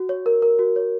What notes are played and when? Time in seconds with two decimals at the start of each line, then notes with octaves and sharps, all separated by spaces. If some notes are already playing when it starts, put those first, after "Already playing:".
Already playing: F#4
0.09 C#5
0.26 A#4
0.42 A#4
0.59 F#4
0.76 C#5